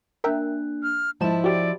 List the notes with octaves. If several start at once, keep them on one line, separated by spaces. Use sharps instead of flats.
A#3 D4 A#4 E5 G5 F#6
F6
G#2 F3 E4 C5 D#5 A5 E7
F#4 G4 D5